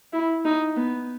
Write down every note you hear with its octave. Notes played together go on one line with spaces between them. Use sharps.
E4
D#4
B3